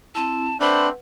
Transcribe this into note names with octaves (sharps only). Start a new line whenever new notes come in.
C4 E4 A5
A3 C4 D4 B4 C5 F#5 B5 C6